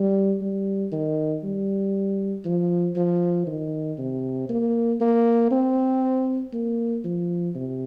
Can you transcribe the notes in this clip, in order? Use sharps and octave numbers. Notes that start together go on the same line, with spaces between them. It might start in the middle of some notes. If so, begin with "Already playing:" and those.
Already playing: G3
G3
D#3
G3
F3
F3
D#3
C3
A#3
A#3
C4
A#3
F3
C3